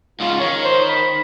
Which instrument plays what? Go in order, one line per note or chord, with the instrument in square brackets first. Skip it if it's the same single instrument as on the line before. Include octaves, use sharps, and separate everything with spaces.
[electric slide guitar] G#2 C#3 [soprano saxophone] F4
[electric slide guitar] D#3 [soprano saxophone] C#5
[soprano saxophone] C5
B5